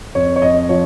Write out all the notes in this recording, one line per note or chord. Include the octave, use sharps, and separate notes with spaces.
F2 C#5
C#5
F2 D#5
F3 C#5